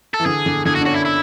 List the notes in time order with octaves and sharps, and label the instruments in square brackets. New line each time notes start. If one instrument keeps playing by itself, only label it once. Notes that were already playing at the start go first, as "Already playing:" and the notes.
[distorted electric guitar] A4
[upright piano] E3
[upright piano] D3 [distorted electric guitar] G#4
[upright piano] D3
[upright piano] D3 [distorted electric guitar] G#4
[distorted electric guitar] F#4
[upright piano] D4
[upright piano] C#4 [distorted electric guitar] F#4
[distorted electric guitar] E4
E4